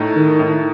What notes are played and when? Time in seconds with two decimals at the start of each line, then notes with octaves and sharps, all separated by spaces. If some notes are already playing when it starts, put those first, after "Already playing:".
Already playing: A2 A3 D#4
0.16 D#3
0.39 A2 A3 D#4